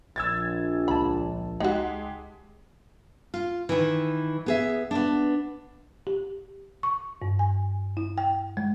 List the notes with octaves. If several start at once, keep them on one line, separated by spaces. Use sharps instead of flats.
A#1 E6 G#6 A6
C#2 A5 B5
G#3 D#4 F#4 G4
F4
D#3 E3
B3 G#4 E5
B3 D4
G4
C#6
G2
G#5
E4
G5
G#3